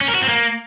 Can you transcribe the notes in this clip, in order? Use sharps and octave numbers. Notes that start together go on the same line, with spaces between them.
C#4
A#4
F#4
C4
A#3